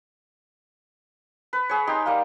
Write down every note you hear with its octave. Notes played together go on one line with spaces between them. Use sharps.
B4
G#4 C#5
D#4 G4 C6
G3 A#3